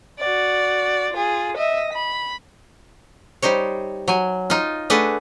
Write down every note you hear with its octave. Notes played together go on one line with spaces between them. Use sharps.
F#4 D5
F4 G#4
D#5 E5
B5
G3 D#4 C5 C#5
F#3 G#5
D#4 F4
A3 D4 G#4 B4 F#5